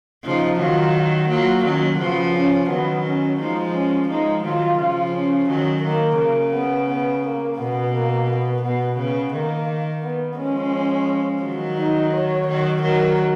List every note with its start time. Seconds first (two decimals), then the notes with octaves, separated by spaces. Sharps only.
0.24 C#3 F3 D#4
0.59 D#3 F#3 F4
0.94 F#4
1.29 F#3 A#3 F4
1.64 D#3 F#3 C#4
1.99 C#3 F3 B3
2.34 C#4
2.69 D#3 F#3 B3
3.05 C#4
3.39 F3 G#3 D#4
3.74 C#4
4.09 F3 G#3 D#4
4.44 D#3 F#3 F4
4.78 C#3 F3
5.14 C#4
5.49 D#3 F#3
5.83 D#3 A#3
6.18 C#3
6.53 B3
6.89 B3
7.24 A#3
7.58 B2 B3
7.94 A#3
8.28 B3
8.63 B2 B3
8.98 C#3 B3
9.33 D#3 A#3
10.03 B3
10.37 F3 G#3 C#4
11.42 D#3 F#3
11.77 D#4
12.12 C#5
12.47 D#3 F#3
12.82 D#3 F#3 A#4